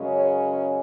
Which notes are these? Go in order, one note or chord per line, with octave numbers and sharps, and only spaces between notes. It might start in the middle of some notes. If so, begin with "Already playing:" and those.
Already playing: F#2 C#3 G#3 C#4
C#5